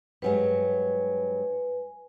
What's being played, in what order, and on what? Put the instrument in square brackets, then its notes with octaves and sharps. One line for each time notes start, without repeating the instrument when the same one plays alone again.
[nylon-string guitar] G2 F#3 G#3 [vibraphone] B4 G#5